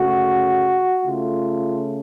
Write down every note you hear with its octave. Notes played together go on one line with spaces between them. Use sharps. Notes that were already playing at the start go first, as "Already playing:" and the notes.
Already playing: C#3 A3 F#4
C#3 A3 F4